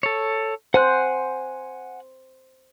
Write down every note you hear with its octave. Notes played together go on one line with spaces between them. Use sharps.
A4 C#5
C5 F#5 G#5 F#6